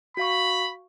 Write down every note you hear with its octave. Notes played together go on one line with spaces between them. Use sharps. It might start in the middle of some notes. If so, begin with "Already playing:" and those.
F#4 F5 B5 C#6